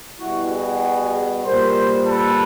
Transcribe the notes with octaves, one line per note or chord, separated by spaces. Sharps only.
B2 G3 E4 F#4
F#4 G#4
A#2 G3 A#4 C5
A4 B4